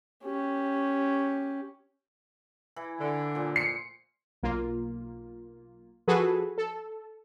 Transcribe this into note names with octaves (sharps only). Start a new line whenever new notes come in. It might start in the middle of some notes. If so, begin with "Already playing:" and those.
C#4 G4
E3 E4
D3
A#2 F3
C7 C#7
B1 A#3 F4
F3 F#4 G#4 A4 B4
A4